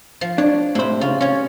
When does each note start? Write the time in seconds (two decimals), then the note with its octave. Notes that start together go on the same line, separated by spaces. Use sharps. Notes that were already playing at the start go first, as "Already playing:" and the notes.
0.21 F3
0.38 D4 C#5
0.75 A2 C3 C5 B5
1.01 C#3 F4
1.21 C#4 F4 C#5